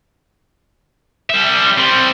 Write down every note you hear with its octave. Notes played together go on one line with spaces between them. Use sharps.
G3 E5
G3 C4